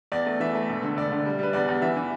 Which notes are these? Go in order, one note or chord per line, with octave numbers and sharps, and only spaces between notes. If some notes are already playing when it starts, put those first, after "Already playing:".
E2 D5
A3
E3 E5
A3
E1
D3
E1 D5
D3
G3
G3 B4
E2 D5
E2
E3 E5
E3